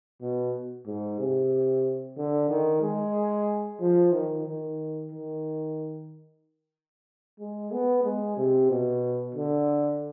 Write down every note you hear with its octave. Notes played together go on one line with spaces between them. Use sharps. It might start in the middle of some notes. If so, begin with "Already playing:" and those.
B2
G#2
C3
D3
D#3
G#3
F3
D#3
D#3
D#3
G#3
B3
G#3
C3
B2
D3